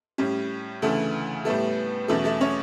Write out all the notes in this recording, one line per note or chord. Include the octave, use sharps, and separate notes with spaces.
A2 G3 C#4
D2 C#3 E3 A3 A4
A2 G3 A3 B3 A4
E2 B2 F#3 A3 C#4 A4
A3 A4
C#4 C#5